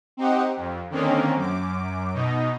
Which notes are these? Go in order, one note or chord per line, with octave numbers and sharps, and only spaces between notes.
C4 D#4 G4 F#5
F2
D3 D#3 A#3 C4 C#4
F#2 D6
B2 D#4